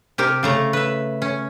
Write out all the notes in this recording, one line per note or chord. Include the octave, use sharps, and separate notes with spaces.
C3 G4 A#4
C#3 A3 A#5
B4 E5
C#4